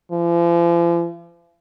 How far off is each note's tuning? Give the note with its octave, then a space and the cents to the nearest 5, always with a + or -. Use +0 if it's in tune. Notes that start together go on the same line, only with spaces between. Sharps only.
F3 -40